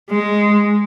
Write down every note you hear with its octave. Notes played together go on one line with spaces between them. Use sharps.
G#3